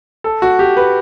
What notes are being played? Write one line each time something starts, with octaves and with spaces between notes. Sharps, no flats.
A4
F#4
G4
B4